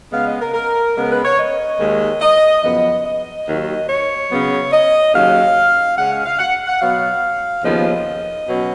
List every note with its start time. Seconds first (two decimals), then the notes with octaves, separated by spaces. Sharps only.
0.12 C#3 G#3 B3 F5
0.26 D#5
0.41 A#4
0.54 A#4
0.96 C#3 G#3 B3 A#4
1.10 B4
1.24 C#5
1.38 D#5
1.80 D#2 D#3 G#3
2.21 D#5
2.63 F#2 C#3 F3 B3 D#5
3.05 D#5
3.47 D#2 D#3 F#3
3.88 C#5
4.30 C#3 F#3 B3
4.72 D#5
5.13 D#2 C#3 F#3 C#4 F5
5.97 C#3 G#3 C#4 F#5
6.12 F5
6.25 F5
6.39 F#5
6.67 F#5
6.81 B2 F#3 B3 F5
7.64 D#2 C#3 F3 B3 D#5
8.48 B2 F#3 C#4